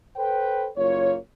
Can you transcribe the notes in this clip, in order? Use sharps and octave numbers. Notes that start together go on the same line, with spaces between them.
A4 B4 C5 G5
F#1 A#3 F4 C#5